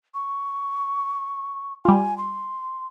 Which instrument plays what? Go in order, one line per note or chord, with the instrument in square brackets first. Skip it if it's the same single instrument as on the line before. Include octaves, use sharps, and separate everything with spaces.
[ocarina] C#6
[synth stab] G3 F4 [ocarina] G#5
[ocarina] C6